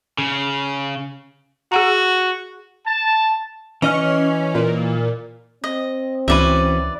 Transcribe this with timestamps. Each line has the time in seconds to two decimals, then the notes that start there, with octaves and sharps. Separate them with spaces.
0.18 C#3
1.72 F#4 G#4 F#5 A#5
2.86 A5
3.82 E3 C#4 D#5 F6
4.55 A#2
5.64 C4 D#5
6.28 C#2 E3 C#4 F#4 B4 D5 E5